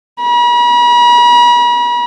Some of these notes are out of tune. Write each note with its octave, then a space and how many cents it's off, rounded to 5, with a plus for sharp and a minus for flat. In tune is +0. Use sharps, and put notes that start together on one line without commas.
B5 -45